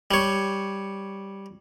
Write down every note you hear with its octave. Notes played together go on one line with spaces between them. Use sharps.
G3 C#5